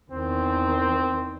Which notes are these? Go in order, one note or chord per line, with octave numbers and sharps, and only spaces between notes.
E2 D#3 C4